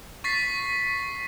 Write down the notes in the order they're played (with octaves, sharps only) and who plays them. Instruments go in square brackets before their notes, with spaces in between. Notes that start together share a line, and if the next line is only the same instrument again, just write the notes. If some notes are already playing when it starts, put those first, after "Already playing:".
[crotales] C#6 A6 B6 C7